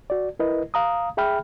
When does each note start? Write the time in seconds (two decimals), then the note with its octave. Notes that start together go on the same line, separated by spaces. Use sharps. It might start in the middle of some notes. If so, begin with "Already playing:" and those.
0.10 F#4 D5
0.40 E4 A#4 B4 D#5
0.74 F5 A#5 D#6
1.17 G#4 E5 G5 B5 F6